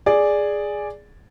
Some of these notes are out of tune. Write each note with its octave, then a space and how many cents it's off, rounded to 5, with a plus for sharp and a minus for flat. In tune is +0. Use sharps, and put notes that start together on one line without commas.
G#4 +0 D5 +0